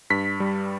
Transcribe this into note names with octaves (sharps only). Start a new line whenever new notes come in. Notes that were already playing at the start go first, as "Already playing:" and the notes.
G2 B6
G3